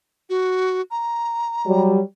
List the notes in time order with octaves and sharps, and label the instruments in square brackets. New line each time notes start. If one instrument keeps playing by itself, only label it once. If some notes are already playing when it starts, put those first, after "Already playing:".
[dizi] F#4
A#5
[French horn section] F#3 G3